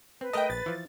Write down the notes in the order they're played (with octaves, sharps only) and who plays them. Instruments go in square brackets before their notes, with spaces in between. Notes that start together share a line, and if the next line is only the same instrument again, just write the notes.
[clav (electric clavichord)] C4 [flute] B4
[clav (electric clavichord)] A3 A#4 A5 [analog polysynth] D#5 G5
[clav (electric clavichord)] A#1 [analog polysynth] A6
[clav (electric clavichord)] E3 F3